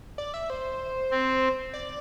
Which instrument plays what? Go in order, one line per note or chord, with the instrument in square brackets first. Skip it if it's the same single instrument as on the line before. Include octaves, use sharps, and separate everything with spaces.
[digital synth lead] D5
E5
C5
[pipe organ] C4
[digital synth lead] D5